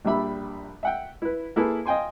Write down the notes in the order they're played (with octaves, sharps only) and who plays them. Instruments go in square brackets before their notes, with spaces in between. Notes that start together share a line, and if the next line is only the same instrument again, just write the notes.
[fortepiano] A#1 G3 D4 E5 B5
E5 F#5 G5
E4 B4
A#3 E4 G#4 A4 B4
D#5 F5 G5 G#5 C6